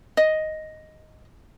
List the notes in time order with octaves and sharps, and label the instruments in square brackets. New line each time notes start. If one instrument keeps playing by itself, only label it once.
[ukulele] D#5